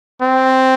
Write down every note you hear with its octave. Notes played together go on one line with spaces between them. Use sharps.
C4